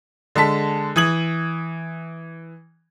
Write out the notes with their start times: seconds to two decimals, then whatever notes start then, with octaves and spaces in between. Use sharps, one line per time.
0.35 D3 G#3 A5 B6
0.96 E3 D#6 G#6 F#7